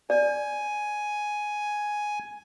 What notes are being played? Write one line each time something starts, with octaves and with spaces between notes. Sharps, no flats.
D5 G#5